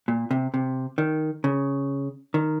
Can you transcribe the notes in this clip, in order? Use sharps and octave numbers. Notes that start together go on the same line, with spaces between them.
A#2
C3
C3
D#3
C#3
D#3